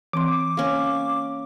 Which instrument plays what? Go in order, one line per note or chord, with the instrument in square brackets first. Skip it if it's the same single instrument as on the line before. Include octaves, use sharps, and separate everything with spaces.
[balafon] E3 C4 C6 [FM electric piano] D6
[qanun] A#3 C#4